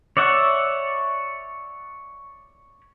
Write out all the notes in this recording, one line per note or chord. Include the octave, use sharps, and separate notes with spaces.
C#5 D5 E5 F#5